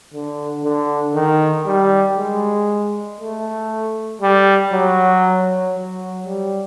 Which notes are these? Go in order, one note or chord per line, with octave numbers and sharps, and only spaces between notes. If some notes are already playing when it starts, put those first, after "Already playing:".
D3
D3
D#3
G3
G#3
A3
G3
F#3
F#3
G3